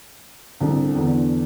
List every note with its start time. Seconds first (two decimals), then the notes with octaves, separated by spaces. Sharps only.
0.60 C2 D3
0.95 E2 D3